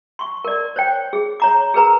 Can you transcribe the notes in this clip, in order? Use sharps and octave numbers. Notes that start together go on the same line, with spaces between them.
C6 C#6
A#4 D5
C5 C#5 G5
G#4
C#5 A#5 D6
G#4 A#4 B4 A#5